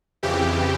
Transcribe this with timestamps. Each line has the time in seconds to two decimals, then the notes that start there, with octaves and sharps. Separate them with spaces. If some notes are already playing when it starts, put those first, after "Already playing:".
0.23 F2 C#3 E3 G4